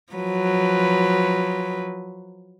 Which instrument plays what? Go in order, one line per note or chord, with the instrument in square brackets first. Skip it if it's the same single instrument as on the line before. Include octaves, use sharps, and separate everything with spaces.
[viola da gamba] F3 F#3 B4